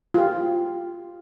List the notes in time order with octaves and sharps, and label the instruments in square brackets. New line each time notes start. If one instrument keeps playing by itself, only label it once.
[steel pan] F4 G4